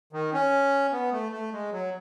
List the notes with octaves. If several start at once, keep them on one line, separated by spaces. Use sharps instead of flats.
D#3
C#4
B3
A3
A3
G#3
F#3